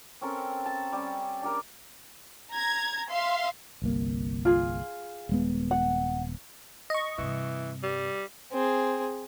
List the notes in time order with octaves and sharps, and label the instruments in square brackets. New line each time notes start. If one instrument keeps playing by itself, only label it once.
[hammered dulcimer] C4 C#4 A4 A#4
A5
G3 C#4
D4 G4 A#4
[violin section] A#5 G#6
E5 F5 C6
[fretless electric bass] G1 C2 A#3
[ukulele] F4 G#4
[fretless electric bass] D#1 G#3 B3
[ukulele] F#5
[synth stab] D#5 C#6
[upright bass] G2 C3 [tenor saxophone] E3
[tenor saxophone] G3
[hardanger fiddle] C4 G#4